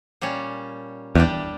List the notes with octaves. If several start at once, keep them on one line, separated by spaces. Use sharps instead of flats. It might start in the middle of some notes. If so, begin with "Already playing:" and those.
A#2 G3 C#4
E2 G3 D4 G4